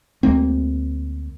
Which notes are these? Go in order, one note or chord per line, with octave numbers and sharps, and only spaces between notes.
D2 G#3 A#3 C4